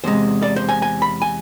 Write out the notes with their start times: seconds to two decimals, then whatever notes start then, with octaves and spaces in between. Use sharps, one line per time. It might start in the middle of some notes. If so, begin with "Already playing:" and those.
0.04 E2 C3 G#3 C5
0.43 D5
0.56 C5
0.69 G#5
0.82 G#5
1.02 B5
1.22 G#5